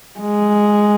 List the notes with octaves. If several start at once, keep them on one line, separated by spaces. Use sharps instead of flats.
G#3